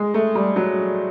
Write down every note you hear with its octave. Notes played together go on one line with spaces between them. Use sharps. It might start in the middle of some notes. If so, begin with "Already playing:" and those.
Already playing: G#3
A3
G3
F#3